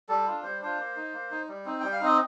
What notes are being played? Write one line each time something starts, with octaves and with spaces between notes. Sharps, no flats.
G3 A4
D4 F4
G3 C5
D4 F4 C5
A#3
D#4
A#3
D#4
G3
C4 D#4
G3 G5
F5
C4 D#4 D#5